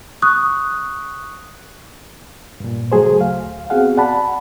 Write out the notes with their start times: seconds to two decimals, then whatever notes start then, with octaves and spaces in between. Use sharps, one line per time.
0.22 C#6 D#6 F#6
2.60 G2 A#2
2.92 C#3 F#3 A3 G#4 C5
3.17 D2 F5
3.70 B3 C4 F#4 G#4 F5 F#5
3.97 D5 F#5 A5 B5